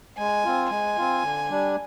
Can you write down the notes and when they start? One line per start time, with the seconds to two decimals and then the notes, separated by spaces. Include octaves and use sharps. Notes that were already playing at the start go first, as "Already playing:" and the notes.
0.18 G#3 G#5
0.44 C4 F4
0.70 G#3 G#5
0.97 C4 F4
1.23 D3
1.50 G3 D4